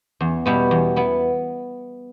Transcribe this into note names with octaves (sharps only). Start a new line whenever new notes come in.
E2
B2 G3 B3 E4
E2
B3 E4